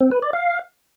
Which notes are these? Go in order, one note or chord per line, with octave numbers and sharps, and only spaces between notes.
C4
B4
D5
F5